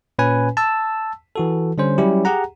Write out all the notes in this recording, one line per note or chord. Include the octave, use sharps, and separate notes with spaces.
A#2 C#4 B4 G#5
A5 E6
E3 F#4 A4
D3 G3 C#4 C5
F#3 G3 C#4 E4 G4
G4 G#4 F#5 A#5